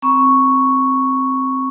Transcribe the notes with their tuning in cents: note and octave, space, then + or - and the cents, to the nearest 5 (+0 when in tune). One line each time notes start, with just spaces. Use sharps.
C4 +0 A#5 +45 C#6 +0